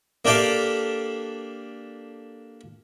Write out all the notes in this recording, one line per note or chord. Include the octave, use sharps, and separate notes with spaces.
A#3 D4 G4 A4 D5 F5